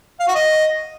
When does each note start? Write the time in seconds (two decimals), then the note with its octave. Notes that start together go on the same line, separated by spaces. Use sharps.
0.20 F5
0.27 F#4
0.35 D#5